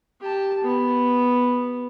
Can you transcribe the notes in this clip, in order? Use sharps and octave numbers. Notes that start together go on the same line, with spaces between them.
G4 A5
B3